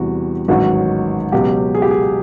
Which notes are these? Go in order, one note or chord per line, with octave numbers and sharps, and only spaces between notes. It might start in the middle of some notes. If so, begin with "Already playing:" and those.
Already playing: E2 C3 E3 G3 F#4
A1 G#2 D#3 F#3 F#4
C#2 B2 F#3 G4
G#4
G4
G#4